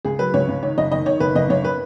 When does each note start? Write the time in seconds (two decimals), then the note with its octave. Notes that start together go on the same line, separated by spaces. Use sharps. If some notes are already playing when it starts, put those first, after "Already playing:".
0.05 C#2 G#4
0.19 F#3 B4
0.34 C#2 C#5
0.49 C#2
0.63 D#3 C#5
0.78 F#1 D#5
0.92 D#3 D#5
1.06 D#3 C#5
1.20 F#1 B4
1.35 F#1 D#5
1.49 F#1 C#5
1.65 B4